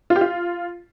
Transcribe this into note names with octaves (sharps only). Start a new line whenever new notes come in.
F4
G4
F4